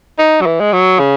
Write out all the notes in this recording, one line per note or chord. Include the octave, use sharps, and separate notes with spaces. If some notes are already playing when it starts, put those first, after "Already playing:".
D#4
F#3
E3
G#3
F#3
C#3